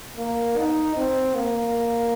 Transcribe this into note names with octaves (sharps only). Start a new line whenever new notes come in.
A#3
D#4
C4
A#3